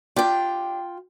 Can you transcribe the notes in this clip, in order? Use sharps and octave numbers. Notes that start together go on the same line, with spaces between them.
D4 F4 G4 G5